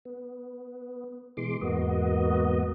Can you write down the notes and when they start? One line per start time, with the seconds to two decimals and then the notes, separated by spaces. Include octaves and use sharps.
0.05 B3
1.37 B2 E3 G#3 C6 D6
1.61 E2 G#2 A#3 B3 F#4 D#5